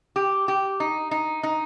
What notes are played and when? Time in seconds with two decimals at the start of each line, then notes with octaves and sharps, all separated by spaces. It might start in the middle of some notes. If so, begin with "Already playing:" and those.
0.16 G4
0.48 G4
0.80 D#4
1.11 D#4
1.43 D#4